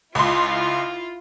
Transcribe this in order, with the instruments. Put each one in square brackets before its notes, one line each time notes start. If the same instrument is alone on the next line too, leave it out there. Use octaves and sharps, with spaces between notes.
[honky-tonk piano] C#2 C6 [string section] E4 F4